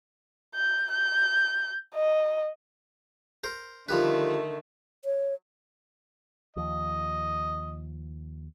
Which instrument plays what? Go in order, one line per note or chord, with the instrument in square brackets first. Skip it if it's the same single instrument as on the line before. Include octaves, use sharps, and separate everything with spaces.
[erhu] G6
G6
D#5
[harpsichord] A#4 C5
[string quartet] D3 D#3 A3 [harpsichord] F3 G3 B4
[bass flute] C#5
[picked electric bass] D#2 F3 [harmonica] D#5